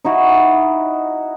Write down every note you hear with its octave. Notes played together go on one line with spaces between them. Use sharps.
D#4 E4 F#4